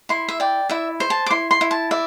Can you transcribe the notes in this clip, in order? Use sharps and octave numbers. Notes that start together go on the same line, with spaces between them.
E4 C6
E5
D5 G5
E4 E5
C5
A5
D6
E4 C6
C6
E4
A5
D5 E5